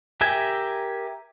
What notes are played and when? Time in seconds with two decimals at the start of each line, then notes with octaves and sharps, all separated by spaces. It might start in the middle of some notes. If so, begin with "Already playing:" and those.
0.21 G4 A#4 E5 G5 G#5